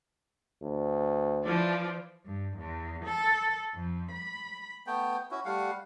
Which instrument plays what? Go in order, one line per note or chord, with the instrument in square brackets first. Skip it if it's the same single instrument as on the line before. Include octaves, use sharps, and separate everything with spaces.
[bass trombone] D2
[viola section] E3 F3 D5
[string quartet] G2
E2
A4
F2
B5
[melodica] A3 B3 G5
C#4 E4 F#4
G3 A3 F5 F#5